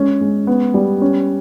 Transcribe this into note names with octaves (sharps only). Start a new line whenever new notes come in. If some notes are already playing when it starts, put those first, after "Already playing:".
Already playing: G#3 C#4
G#3
B3
G3
C#4